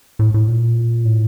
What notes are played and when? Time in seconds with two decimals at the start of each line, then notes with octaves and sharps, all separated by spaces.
0.19 A2
0.34 A2
0.48 A#2
1.05 A2